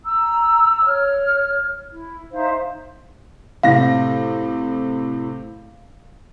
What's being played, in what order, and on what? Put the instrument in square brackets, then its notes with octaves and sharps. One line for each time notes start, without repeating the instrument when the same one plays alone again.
[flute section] A#5 E6
C#5 F6
E4
D#4 C5 E5 F5
[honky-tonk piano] A2 C3 A#6 [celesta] F5